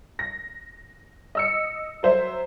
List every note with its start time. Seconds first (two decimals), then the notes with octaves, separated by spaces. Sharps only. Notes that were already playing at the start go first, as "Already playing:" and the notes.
0.19 A#6
1.35 D#5 E6 C#7
2.03 F#3 C5 E5